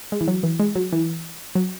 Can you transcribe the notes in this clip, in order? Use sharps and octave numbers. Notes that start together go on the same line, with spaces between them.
G#3
E3
F#3
E3
G#3
F#3
E3
F#3